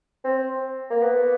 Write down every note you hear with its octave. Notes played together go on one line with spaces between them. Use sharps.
C4
A#3
B3